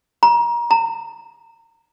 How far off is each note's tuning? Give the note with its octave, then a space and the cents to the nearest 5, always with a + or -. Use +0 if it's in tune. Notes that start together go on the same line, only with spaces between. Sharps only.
A#5 +30
A#5 -30